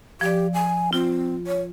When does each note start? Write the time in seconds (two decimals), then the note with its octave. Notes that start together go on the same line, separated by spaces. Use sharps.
0.21 F3 G4 D5
0.54 G#5
0.93 C4 F4
1.47 C#5